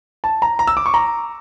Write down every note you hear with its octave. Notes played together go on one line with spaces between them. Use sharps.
A5
A#5
A#5
E6
D6
C#6
A#5